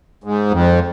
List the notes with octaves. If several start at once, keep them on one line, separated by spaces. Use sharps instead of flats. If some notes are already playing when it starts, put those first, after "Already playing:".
G#2
F2